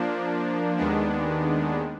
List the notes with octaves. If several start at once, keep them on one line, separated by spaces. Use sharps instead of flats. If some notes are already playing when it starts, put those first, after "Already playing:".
Already playing: F3 A#3 D4
D#2 D#3 G#3 B3 D4